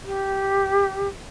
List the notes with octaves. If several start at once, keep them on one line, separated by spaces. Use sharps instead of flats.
G4